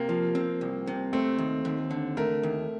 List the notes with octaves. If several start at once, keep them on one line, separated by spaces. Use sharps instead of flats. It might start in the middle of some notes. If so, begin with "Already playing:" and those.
Already playing: C3 A#3
F3
C4
C2
C3
A3 C4
D#2
D#2
D3
A3 A#4
D#2